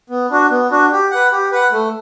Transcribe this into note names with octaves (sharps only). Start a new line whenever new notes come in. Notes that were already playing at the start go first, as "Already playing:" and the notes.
B3
D4 F#4
B3
D4 F#4
G4
B4 F#5
G4
B4 F#5
A3